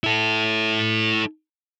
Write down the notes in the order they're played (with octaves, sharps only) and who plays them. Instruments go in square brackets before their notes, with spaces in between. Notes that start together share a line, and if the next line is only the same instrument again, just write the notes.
[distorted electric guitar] E4 A4